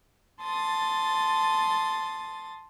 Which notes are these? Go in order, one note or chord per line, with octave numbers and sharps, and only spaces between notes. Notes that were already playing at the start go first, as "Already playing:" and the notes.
A5 C6 D#6 A6